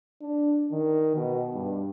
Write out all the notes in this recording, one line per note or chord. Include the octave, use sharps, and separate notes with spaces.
D4
D#3
B2
G2